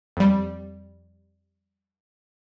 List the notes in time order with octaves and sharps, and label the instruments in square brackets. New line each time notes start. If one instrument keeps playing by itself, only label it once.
[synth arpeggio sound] F2 G3